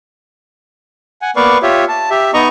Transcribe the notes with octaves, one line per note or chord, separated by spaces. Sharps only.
F#5 G#5
A#3 B3 B4 D5 F5 C#6
F4 G4 C#5 E5
A5
G4 E5
B3 D#4 D#5 A#5 C#6